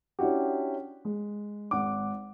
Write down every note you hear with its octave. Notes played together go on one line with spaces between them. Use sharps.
C#4 D4 E4 F#4 G4
G#3
G#1 F#5 D6